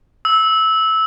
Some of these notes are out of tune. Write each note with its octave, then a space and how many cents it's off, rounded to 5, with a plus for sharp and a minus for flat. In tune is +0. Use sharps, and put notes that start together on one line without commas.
E6 -15